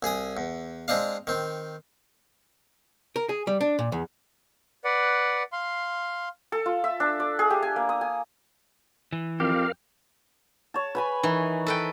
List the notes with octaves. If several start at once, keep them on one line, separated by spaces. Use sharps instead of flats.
C2 G#4 G#5 D#6
E2
G#3 C4 D4 D#5 F5
D#3 C4
A#4
G#4
G3
D4
A#2
E2
B4 D5 F#5
F5 C6
A4
F4
E5
D4
D5
G#4
G4
G#5
A#3
D#6
G#5
E3
F2 G4 A#4 F5
C#5 A5
B4 G#5 B5
D#3 E3
A4 B4 G5